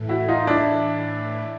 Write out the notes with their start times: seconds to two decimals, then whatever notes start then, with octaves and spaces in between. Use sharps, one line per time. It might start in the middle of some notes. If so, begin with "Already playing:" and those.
Already playing: A2 E3 A3
0.09 E4 F#4
0.28 D#4 F4
0.47 D4 E4